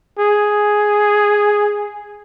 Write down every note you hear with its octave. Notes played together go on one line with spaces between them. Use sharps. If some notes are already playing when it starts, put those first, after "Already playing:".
G#4